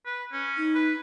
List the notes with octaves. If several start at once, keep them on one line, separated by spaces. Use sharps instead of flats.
B4
C#4
D#4
B4